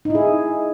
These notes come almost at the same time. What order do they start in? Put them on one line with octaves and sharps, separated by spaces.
D#4 E4 G#4